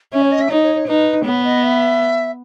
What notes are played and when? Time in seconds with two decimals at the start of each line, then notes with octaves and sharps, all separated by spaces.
0.12 C#4 E5
0.22 C#5
0.32 D#5
0.41 E5
0.50 D#4 C#5
0.63 C#5
0.75 C#5
0.87 D#4 B4
1.25 B3 C#5
1.44 D#5
1.63 E5